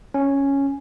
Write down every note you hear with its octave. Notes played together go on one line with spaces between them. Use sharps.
C#4